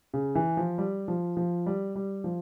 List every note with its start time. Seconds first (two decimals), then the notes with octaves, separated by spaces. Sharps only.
0.14 C#3
0.35 E3
0.57 F3
0.78 G3
1.08 F3
1.37 F3
1.66 G3
1.96 G3
2.24 F3